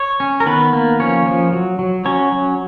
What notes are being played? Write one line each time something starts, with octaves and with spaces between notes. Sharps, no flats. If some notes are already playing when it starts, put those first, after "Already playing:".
Already playing: C#5
C#4
A#4
D#3 B3 B4
A#3
F3 C#4 C#5
F3
F#3
F#3
F#3 C#4 C#5
F#3